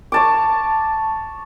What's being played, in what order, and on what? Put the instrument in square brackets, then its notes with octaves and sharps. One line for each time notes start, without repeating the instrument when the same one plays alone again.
[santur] C#5 A5 D6